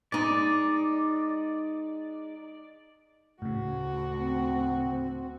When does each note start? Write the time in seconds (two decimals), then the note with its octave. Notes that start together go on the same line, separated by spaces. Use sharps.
0.12 G#3 D#4 D5
3.42 D2 A2 C#3 F#4
4.19 C4